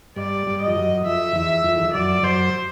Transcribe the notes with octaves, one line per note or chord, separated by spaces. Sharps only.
G2 D5
G2
D#5
F2
F#2
F2 E5
E2
F2
E2
F2
F#2 D5
F#2 C5